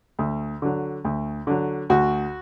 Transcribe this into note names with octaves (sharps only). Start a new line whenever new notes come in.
D2
D3 F#3
D2
D3 F#3
D2 F#4